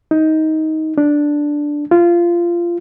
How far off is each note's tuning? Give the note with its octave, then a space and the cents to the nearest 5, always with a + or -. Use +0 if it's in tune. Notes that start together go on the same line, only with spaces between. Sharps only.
D#4 +15
D4 +0
F4 -20